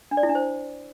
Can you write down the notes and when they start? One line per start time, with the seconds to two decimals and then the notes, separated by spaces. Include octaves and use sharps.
0.11 D4
0.17 D5
0.23 E4
0.29 D4
0.35 C5